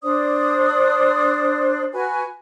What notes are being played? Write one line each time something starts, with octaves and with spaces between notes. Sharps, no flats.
D4 C5 D5 D#6
F#4 B4 G#5